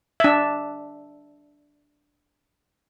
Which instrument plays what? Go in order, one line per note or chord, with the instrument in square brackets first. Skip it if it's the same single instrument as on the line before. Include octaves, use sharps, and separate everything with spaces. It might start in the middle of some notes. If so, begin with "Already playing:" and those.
[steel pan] D4 E5